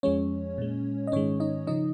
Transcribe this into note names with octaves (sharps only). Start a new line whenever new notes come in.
F2 F3 G#3 C#4 C#5
A#2 G#3
D#5
G#2 D#3 G#3 C#4 C#5
D#4 D#5
C#3 F3 D#4 D#5